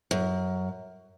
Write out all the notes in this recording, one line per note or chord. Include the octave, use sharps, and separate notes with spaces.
F#2